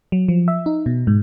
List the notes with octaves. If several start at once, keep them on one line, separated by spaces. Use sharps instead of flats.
F#3
F3
E5
D#4
B2
G#2